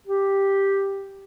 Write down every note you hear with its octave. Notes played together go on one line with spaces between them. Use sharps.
G4